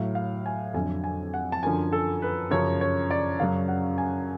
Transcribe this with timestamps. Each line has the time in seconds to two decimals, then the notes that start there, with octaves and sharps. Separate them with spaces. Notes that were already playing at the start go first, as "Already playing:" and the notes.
Already playing: A2 F#3 F5
0.15 F5
0.46 G#5
0.74 F2 D3 F#3 G#5
1.04 G#5
1.34 F#5
1.52 A5
1.63 F#2 D3 F3 G#5
1.92 A4
2.22 B4
2.51 F#2 C#3 F3 C#5
2.81 C#5
3.11 D5
3.40 F#2 C#3 F#3 F5
3.68 F#5
3.98 G#5